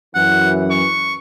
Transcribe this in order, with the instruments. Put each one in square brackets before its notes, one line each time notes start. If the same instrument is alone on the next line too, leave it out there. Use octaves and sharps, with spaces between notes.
[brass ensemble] F#2 E3 [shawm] F#5
[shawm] C#6